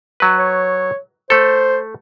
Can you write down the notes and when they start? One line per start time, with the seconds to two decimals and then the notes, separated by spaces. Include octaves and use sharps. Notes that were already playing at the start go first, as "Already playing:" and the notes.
0.20 F#3 B4
0.38 C#5
1.30 A3 A4 C5